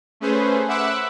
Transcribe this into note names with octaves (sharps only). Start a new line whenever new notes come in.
A3 C#4 G#4 B4 C5
E5 F#5 B5 D6 E6 F#6